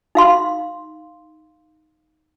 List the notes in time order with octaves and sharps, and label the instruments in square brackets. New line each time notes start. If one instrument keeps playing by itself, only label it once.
[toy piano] D#4 F5 C6